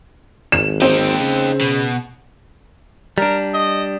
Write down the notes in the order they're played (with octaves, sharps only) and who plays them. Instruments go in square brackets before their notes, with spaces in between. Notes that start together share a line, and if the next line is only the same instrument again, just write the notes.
[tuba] G#1 [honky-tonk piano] E7
[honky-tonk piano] C4 [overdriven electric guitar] D#4 G4
[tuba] C#3
[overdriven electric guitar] B2
[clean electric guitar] G3 D4 [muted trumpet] A#4
[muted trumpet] D#5